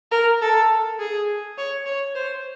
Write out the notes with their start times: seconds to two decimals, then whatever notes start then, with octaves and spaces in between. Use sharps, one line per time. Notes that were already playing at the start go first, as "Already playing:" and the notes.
0.11 A#4
0.41 A4
1.00 G#4
1.58 C#5
1.86 C#5
2.15 C5